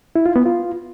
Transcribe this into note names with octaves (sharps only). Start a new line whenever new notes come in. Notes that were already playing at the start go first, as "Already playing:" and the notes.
E4
F4
B3
F4